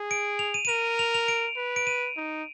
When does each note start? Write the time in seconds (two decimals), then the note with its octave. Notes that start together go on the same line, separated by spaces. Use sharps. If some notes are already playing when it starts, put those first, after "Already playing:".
Already playing: G#4
0.11 D7
0.39 F7
0.54 D#7
0.65 D#7
0.69 A#4 F7
0.99 F7
1.14 F7
1.28 D7
1.57 B4
1.76 D7
1.87 D#7
2.17 D#4